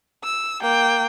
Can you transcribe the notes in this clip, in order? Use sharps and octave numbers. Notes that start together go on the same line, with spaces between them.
E6
A#3 G5